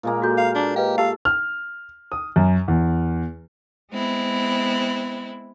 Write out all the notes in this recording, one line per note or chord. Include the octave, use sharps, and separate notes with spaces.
A#2 G#3 A#3
F#4 A4 G6
F5
D4
G4 B4 D#5 F5
G4 A4 F5
F6
D#6
F#2
E2
G#3 B3 C4 E4